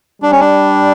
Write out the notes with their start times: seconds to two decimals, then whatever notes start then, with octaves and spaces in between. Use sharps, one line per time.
0.22 G3 D4
0.32 C#4
0.40 D4